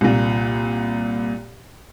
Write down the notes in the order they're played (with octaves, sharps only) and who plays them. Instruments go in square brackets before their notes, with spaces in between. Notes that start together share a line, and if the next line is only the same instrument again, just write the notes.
[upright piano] C2 A#2